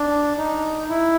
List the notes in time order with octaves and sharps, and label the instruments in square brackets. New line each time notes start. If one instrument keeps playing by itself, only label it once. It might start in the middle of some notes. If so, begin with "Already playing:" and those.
Already playing: [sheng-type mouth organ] D4
D#4
E4